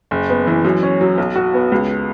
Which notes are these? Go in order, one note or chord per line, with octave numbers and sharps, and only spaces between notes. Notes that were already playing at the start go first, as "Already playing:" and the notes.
F#1
B3
E3
F#2
C#4
F#3
B1
F#4
B3
C#2